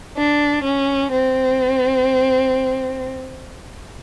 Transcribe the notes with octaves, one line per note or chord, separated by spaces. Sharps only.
D4
C#4
C4